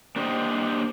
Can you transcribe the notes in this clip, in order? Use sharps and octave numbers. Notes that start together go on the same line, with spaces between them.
A#3 D4 G4 C5 D#5